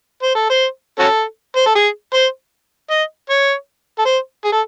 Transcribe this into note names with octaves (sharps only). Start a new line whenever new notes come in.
C5
A4
C5
C#4 F#4 A4
C5
A4
G#4
C5
D#5
C#5
A4
C5
G#4
A4